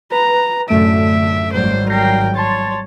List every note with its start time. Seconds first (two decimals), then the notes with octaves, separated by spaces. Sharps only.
0.12 B4 A#5
0.69 F#2 A2 D3 A3 E5 D7
1.53 G#1 F#3 G3 C5
1.90 A#4 G5 G6 A#6 C7
2.35 C#5 A5 C6 A6